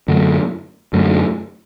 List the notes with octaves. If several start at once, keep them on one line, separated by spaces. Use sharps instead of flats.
F#2 D3 F#3 A3
F#2 D3 F#3 A3